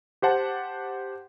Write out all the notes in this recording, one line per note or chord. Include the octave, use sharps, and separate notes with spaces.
G4 C5 F#5 A5